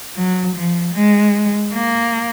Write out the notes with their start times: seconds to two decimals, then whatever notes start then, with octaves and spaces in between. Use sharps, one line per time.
0.16 F#3
0.55 F3
0.94 G#3
1.73 A#3